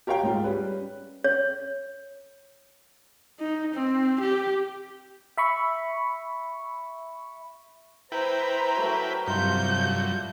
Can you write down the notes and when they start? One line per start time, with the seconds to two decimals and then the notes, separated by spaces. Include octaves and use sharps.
0.07 G4 A#4 C#5 F5 G5
0.23 G#2 C#4 F4
0.44 G3 C#4 B4
1.24 C#5
3.39 D#4
3.74 C4
4.20 G4
5.37 E5 B5 C#6
8.12 E4 B4 C5 G5 A#5
8.76 F#3 A3 A#4
9.27 G2 C3 F#3 E4 F4 F5 G6